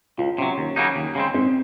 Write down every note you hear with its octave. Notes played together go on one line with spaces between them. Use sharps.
C#2 F4
C3 F#3 C#4
D#2
C#3 F#3 A#3 D#4
D#2
C#3 G#3 C4
G#2 C4